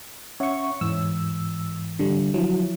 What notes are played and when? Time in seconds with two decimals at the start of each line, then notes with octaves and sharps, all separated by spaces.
0.40 C#4 C#5 E5 F#5 C#6
0.81 E2 G#2 E3 E6
1.99 D3 G3
2.34 F3 F#3 E4